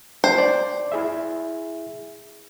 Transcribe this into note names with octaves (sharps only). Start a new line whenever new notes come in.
C5
D5
E4 G#4 E5